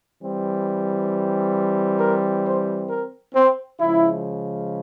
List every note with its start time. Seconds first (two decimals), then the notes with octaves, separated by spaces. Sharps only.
0.20 E3 G3 C4
1.99 A#4
2.45 C5
2.89 A#4
3.35 C4
3.79 C#3 F3 G#3 E4